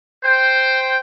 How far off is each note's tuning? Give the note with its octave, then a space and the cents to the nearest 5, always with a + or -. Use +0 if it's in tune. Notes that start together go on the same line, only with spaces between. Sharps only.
C5 +0 G5 +0